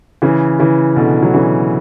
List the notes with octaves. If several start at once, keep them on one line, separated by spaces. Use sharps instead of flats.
C#3 E3
C#3 E3
B2 D3
F#3
C#3 E3